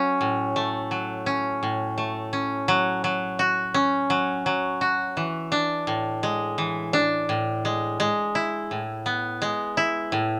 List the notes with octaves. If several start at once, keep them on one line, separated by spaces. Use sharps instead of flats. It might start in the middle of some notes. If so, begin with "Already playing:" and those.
Already playing: F#3 C#4
A2
A3
F#3
C#4
A2
A3
C#4
F#3
F#3
F#4
C#4
F#3
F#3
F#4
E3
D4
A2
G#3
E3
D4
A2
G#3
G#3
E4
A2
B3
G#3
E4
A2